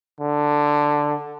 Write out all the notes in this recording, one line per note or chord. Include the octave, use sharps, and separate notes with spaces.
D3